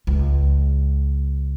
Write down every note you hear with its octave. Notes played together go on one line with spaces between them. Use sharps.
C#2